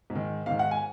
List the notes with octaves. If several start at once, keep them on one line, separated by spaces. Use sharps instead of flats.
G#2
D#3
G#2 D#3 F5
F#5
G#5